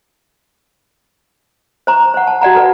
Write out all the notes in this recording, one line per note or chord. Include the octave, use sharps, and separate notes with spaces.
C5 A#5 C#6
C5 F#5
A5
F#4 D5 F#5 A#5
A4 B4 F#5